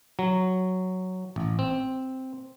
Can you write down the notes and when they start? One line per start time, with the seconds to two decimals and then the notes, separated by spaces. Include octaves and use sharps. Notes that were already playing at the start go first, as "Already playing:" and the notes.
0.19 F#3
1.36 A1
1.59 C4